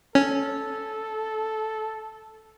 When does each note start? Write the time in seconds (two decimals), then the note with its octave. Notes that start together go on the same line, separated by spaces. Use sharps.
0.15 C#4 A4